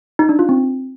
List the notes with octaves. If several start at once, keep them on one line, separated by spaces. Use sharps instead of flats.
D#4
D4
F4
C4